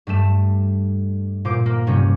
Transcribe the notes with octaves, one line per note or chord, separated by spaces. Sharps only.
G2 G3 A3 E7
A#2 C5 D6
A#3
G2 C3 G3 C#4